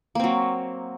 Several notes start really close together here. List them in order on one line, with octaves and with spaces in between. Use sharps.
A#3 C4 F#3